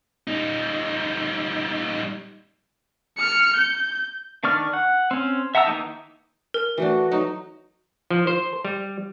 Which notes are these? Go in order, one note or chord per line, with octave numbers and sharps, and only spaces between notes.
G3 D#4
F6 C#7
G6
D#3 D4 D5 C#6 F6
F#5
C4 C#4
E5 F#5 A5 A#5 E6
D#3 E3 G3 A#3 D#4
A#4
E3 A3 D4 F#4
F#3 D#4
F3
C5
G3